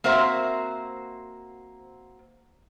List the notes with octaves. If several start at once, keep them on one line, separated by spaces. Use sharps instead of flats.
A#3 C4 F#4 C5 E5